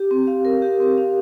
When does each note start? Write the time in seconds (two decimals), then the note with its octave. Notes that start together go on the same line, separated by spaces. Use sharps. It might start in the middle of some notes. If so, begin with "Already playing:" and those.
Already playing: G4
0.11 C4
0.27 F5
0.45 A#4
0.62 G4
0.80 C4
0.98 F5